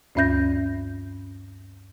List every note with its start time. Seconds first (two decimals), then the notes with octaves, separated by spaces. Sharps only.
0.15 D2 G2 C#4 E5 G6 A#6